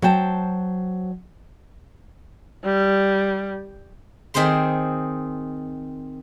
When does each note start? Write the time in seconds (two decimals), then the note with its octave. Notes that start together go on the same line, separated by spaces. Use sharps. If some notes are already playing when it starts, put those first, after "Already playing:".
0.02 F#3 C5 G5 A5
2.64 G3
4.34 D#3 C4 G#4 C5 C6